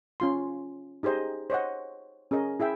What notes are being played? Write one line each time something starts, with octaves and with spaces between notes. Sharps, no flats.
C#4 F4 C6
D#4 G4 G#4 C5 D#5
C5 C#5 D#5 F#5
C#4 G#4 A#4 D#5
E4 G#4 E5 G5